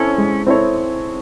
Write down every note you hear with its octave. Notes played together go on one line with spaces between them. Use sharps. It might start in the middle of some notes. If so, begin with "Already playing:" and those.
Already playing: C4 C#4 E4 A4 C#5
G#3
C4 E4 A4 C#5